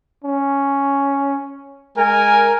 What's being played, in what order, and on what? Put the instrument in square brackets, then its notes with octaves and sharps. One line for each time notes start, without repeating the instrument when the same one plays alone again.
[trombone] C#4
[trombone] G#3 [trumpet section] A#4 G#5